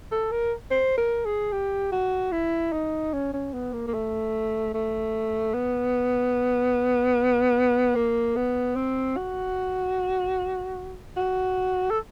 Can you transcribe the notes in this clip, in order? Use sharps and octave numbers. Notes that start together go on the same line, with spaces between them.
A4
A#4
C5
A#4
G#4
G4
F#4
E4
D#4
C#4
C#4
B3
A#3
A#3
A3
A3
B3
A#3
B3
C4
F#4
F#4
A4